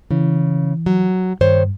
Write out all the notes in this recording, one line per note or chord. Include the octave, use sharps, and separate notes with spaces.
C#3 E3
F#3
G2 D#3 C5 C#5